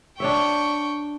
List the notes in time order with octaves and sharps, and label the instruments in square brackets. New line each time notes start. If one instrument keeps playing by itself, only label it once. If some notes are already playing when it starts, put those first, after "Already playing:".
[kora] D4 C#5 E5 [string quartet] G5 C#6